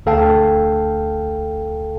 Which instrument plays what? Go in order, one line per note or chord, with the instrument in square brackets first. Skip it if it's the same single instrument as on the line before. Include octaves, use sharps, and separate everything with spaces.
[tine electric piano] D2 A4 F5 G5 A5